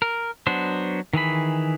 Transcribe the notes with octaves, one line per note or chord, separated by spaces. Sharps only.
A#4
F#3 B3 D4 C5
D#3 E3 G#4 B5